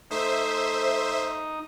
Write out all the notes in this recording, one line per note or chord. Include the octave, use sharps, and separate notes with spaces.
A3 D#4 C5 E5